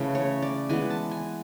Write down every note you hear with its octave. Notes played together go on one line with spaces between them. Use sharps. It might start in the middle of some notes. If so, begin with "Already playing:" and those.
Already playing: C#3 E3 A3
C#5
D5
E3 G#3 B3 G#5
A5
G#5